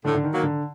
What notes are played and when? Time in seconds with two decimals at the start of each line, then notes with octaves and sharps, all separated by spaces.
0.04 A2 D3
0.15 D3
0.23 D#3
0.33 F#3 A#3
0.43 D3